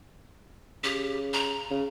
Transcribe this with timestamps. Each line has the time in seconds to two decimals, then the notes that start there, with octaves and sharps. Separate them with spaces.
0.84 C#3 G4
1.33 A#5
1.71 C#3